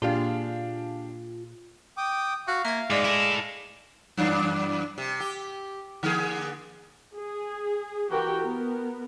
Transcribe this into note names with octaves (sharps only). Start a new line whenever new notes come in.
A#2 D4 F4 G4 G#4 F5
G5 D6 D#6
F#4 F5
A#3 E5 G#6
G#2 G#3 D5 D6
E4 A4 A#6 D#7
F#2 E3 D4
C3
G4
D3 A#3 G#4
G#4
E3 F#4 G4 A#4 G5
B3 A#4